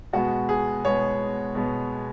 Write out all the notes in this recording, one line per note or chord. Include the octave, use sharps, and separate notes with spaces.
B2 G#3 B3 F#4
G#4
B2 G#3 B3 C#5
B2 G#3 B3